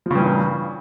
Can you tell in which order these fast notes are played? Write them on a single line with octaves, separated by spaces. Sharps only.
F3 C#3 G2 E3 A#2